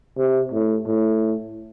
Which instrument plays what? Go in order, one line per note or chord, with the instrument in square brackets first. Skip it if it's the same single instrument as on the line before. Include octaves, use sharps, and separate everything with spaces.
[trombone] C3
A2
A2